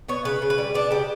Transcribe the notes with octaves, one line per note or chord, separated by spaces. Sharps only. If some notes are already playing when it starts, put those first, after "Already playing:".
B3 C#5
C#3 B4
C#3
B4
G3
B3 D4
C#3 G4